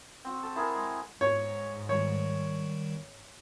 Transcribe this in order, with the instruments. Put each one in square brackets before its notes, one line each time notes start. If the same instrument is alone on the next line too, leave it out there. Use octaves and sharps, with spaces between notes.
[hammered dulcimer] C4 F#4
A4
E4 G#4 A#4 F#5
G#3
[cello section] G#2 [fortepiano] C#5
[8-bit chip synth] D#3 G3 [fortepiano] C#5